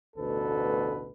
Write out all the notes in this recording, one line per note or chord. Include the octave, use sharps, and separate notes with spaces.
A1 D2 B2 A4 B4